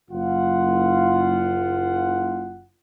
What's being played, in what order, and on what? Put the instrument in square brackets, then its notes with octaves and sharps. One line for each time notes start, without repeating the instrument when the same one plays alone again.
[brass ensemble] F#1 F4 F#5